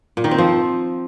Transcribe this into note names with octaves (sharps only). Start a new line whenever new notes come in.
A#2
D#3
C4
F3